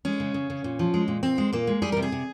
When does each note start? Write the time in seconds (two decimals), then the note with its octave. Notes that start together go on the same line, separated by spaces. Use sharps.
0.05 G#3 C#4
0.20 C#3
0.34 C#3
0.50 C#3
0.64 A#2
0.79 F3
0.94 G#3
1.08 A#2
1.23 A#2 C4
1.38 G#3
1.53 A#2 A#3
1.67 G#3
1.82 G3 G#4
1.92 C3 A#4
2.02 G#4
2.12 C3